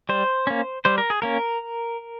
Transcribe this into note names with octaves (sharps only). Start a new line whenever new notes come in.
G3 C5
A#3 C#4
G3 C5
A#4
G#4
A#3 C#4 A#4